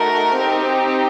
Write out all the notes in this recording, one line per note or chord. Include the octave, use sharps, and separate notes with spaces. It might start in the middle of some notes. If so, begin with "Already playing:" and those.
Already playing: A3 D#4 F#4 A#4
C4 D#4 G4